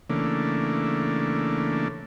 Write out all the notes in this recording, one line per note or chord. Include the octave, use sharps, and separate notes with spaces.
C#3 E3 A3 A#3 D4